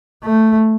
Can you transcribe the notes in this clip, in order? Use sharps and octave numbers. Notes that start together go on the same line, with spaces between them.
A3